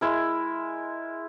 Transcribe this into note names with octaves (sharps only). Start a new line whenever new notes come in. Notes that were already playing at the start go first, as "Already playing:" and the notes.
G#3 E4 A#4